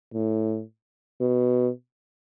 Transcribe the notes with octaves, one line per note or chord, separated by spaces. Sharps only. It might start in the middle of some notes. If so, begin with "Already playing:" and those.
A2
B2